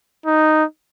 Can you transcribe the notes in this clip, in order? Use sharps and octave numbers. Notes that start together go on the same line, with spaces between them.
D#4